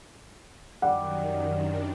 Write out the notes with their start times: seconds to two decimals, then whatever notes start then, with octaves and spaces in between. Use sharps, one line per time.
0.82 F#2 D#3 G3 F#5
1.53 F#2 D#3 D4